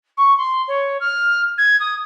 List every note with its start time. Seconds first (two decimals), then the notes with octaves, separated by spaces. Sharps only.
0.17 C#6
0.38 C6
0.68 C#5
1.00 F6
1.58 G#6
1.80 D#6